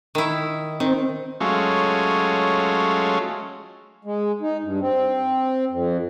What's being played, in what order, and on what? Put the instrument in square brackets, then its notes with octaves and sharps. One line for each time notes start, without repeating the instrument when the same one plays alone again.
[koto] D#3 E4
[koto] D#3 [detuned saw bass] C4
[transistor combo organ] F#3 G#3 A3 C#4 F4
[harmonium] G#3
D#4
G2
C4
F2